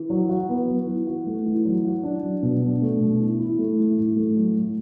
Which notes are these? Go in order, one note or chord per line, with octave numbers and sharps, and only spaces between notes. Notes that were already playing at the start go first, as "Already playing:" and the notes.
Already playing: E3
F#3
F#4
B3
F#3
E3
F#4
A3
E3
F#3
F#4
D4
F#3
B2
D4
A3
B2
E3
E4
A3
E3
A2
A3
F#3
A2